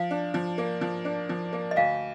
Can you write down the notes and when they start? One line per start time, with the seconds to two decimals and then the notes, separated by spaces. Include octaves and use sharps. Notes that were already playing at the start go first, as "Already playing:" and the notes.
Already playing: F3 F5
0.11 D4
0.34 F3
0.58 A#3
0.81 F3
1.05 D4
1.29 F3
1.53 A#3
1.71 D#5
1.76 D2 F5